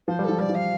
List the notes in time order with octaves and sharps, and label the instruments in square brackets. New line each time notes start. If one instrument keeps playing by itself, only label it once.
[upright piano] F3 [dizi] C5
[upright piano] G3
[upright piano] F3 [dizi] A4
[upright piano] G3 [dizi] D5
[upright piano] F3
[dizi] F5